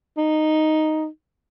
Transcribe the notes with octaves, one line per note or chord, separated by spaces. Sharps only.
D#4